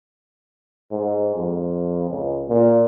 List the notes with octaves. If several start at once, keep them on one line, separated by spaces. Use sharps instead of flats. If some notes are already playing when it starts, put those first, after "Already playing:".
G#2
F2
C#2
A#2